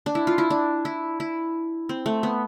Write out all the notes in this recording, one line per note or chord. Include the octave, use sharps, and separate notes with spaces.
D4
E4
F4
E4
D4
E4
E4
C4
A3
B3